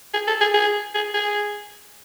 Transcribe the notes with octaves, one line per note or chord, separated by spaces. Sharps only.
G#4
A4
G#4
G#4
G#4
G#4